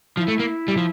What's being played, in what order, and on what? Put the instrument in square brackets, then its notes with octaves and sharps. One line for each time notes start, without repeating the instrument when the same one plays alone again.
[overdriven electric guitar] F3 [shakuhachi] E4
[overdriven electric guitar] A3
A#3
G3
F3